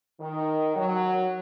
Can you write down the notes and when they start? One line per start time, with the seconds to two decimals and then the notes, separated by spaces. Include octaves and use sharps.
0.20 D#3
0.76 F#3